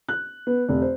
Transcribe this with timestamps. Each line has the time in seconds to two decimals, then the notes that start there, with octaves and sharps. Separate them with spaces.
0.08 F#6
0.47 B3
0.69 F1
0.82 C5